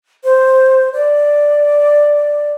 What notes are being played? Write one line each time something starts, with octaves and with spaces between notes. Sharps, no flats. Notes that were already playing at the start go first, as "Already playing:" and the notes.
C5
D5